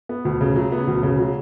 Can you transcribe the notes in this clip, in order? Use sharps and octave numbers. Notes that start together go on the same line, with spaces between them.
B3
D2
C#3
F#3
B3
D2
C#3
F#3